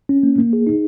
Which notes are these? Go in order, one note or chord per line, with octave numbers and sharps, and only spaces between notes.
C#4
A#3
A#3
G#4
D#4